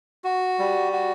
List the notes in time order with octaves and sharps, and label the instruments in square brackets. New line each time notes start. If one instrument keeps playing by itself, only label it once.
[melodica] F#4
G3
F#4